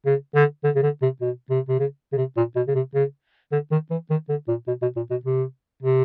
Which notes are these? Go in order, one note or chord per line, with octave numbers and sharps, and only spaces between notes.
C#3
D3
D3
C#3
D3
C3
B2
C3
C3
C#3
C#3
C3
A#2
B2
C#3
C3
C#3
D3
D#3
E3
D#3
D3
A#2
B2
B2
A#2
B2
C3
C3